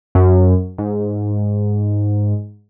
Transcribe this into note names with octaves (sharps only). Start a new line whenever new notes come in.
F#2
G#2